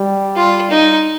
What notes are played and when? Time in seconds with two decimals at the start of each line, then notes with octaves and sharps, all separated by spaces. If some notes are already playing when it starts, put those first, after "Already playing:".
Already playing: G3
0.36 F4
0.71 D#4